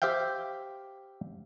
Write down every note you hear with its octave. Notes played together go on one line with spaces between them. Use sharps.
G4 C5 E5 F5 G5